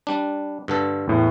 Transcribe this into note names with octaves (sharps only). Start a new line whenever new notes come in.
G3 D4
G2 D3 A4
E2 A2